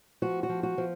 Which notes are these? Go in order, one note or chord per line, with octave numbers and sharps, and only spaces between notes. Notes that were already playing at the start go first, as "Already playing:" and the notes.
F3 F#4
F#4
F3
F#4
F3